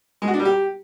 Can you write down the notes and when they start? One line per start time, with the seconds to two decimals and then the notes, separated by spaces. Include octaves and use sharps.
0.22 G#3
0.28 F#4
0.34 D4
0.39 G3
0.45 G4